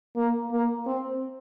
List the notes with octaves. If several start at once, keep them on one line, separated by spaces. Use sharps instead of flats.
A#3
A#3
C4